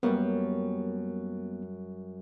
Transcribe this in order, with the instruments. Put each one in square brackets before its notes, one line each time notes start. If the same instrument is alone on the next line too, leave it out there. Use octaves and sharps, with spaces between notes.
[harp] F#2 G3 [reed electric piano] A#3 B3